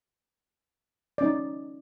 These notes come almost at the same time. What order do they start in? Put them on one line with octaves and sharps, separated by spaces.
D5 C#4 D#4